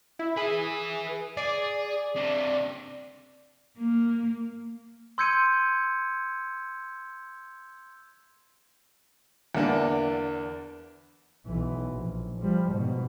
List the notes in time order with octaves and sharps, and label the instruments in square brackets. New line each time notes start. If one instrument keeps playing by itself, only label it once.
[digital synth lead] E4
[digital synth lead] G#4 [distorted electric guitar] B4 E5
[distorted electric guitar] G#4 [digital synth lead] D5
[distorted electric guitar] C3 D4
[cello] A#3
[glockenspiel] C6 E6 G6 G#6 C#7 D#7
[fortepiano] E2 D3 A#3 D4
[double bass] B1 E3
A#1
F3 G3
G#2 B2